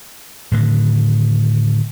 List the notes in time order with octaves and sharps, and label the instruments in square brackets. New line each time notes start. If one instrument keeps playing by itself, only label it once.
[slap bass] A2 D3 D#3